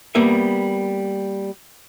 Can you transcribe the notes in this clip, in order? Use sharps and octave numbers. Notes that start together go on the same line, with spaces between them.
G3 A#3 B3 B4 E5